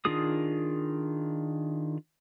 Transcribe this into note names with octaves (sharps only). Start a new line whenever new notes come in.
D#3 D4 F4 G#4 D#6